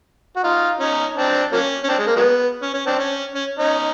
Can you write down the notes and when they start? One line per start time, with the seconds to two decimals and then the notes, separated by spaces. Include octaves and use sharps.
0.36 F#4
0.44 D#4 F4
0.80 C#4 D#4
1.17 C4 D4
1.53 F#3 A#3 C#4
1.84 C#4
1.89 C4 D4
1.99 G#3
2.07 A#3
2.16 F#3 G#3 B3
2.62 C#4
2.74 C#4
2.87 C4 D4
2.99 C#4
3.35 C#4
3.59 C#4 D#4